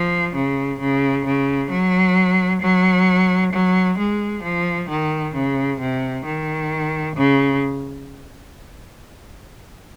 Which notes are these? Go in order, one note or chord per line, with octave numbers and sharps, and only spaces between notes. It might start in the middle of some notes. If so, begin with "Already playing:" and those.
Already playing: F3
C#3
C#3
C#3
F#3
F#3
F#3
G#3
F3
D#3
C#3
C3
D#3
C#3